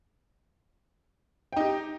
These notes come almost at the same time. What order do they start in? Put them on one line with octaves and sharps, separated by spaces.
G5 D#4 G4